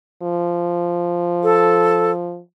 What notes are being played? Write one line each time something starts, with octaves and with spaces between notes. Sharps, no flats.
F3
A4